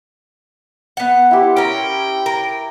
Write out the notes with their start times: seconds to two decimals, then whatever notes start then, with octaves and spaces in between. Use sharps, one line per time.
0.97 B3 F#5
1.31 E4 G4 C6
1.57 C#4 A#4 G5
2.26 A#4